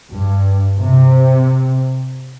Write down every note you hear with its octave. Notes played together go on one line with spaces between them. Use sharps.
G2
C3